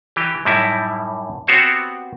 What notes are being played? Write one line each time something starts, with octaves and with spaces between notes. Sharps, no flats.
E3 G4
F#2 A2 G3 D#4 E4
B3 C4 F#4 G4 C5 C#5